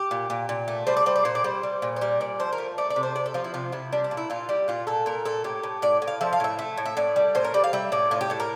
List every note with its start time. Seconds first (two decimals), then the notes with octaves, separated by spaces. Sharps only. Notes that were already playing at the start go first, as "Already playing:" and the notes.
Already playing: G4
0.11 A#2
0.30 A#2
0.49 A#2
0.68 A3
0.87 G3 C5
0.97 D5
1.06 G3 C5
1.16 D5
1.25 A#2 C5
1.35 D5
1.44 G3 C5
1.63 G3
1.82 A#2
1.96 C5
2.01 G3 A#4
2.21 A#2 D5
2.40 F3 C5
2.53 A#4
2.58 A3
2.78 A3 D5
2.90 D5
2.96 C3
3.03 C5
3.15 C3 D5
3.26 A4
3.34 F3 F4
3.44 E4
3.54 C3 F4
3.72 C3 E4
3.92 G3 D4
4.04 D4
4.11 A#2
4.17 E4
4.30 A#2 F4
4.49 G3 G4
4.68 A#2 F4
4.87 A#2 A4
5.06 A#2 A#4
5.25 A#2 A4
5.44 A2 G4
5.63 A2
5.82 A2 D5
6.02 A2
6.08 F5
6.21 F3 E5
6.33 F5
6.40 A2 E5
6.59 A3
6.78 A2
6.86 E5
6.97 A2 D5
7.16 G3
7.35 A2 C5
7.44 A#4
7.54 G3 D5
7.64 F5
7.73 G3 E5
7.92 A2 D5
8.11 A2 F4
8.21 G4
8.30 A2 A4
8.40 A#4